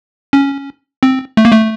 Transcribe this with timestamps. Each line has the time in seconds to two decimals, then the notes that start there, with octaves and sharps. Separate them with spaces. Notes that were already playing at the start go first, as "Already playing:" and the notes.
0.33 C#4
1.03 C4
1.37 A3
1.45 A#3
1.52 A3